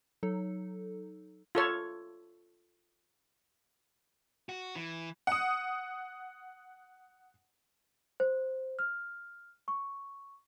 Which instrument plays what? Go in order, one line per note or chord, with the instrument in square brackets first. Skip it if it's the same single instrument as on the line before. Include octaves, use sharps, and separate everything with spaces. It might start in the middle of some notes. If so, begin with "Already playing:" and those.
[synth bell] F#3 D#4 A4
[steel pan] F4 A4 C#5
[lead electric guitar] F#4
E3
[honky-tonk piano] F#5 D#6
[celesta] C5
F6
C#6